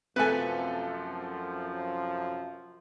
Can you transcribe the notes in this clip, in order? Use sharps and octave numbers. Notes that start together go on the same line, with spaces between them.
F#2 C3 F3 A3 C4 A4 B4 G#5